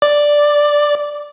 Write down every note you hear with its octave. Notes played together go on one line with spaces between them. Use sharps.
D5